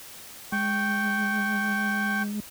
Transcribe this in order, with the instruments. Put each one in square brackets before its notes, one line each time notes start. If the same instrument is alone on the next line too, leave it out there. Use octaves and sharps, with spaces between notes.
[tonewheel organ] G#3 [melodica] G5 C#6